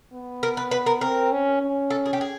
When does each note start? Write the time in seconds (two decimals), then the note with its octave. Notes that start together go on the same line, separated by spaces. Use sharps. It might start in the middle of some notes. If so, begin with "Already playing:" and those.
0.13 B3
0.43 A#4
0.57 B4
0.71 B4
0.86 A#4
1.01 C4 A#4
1.32 C#4
1.62 C#4
1.90 A4
2.06 G#4
2.13 G4
2.21 G#4